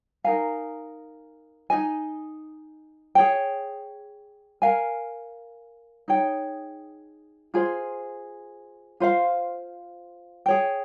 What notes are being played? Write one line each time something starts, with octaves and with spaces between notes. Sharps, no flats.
D#4 A#4 F5 G#5
D#4 G#4 D#5 G#5
G#4 C#5 G5
A#4 F5 G#5
D#4 G#4 C#5 G5
F4 G#4 C5
F4 C5 F5
G#4 C#5 G5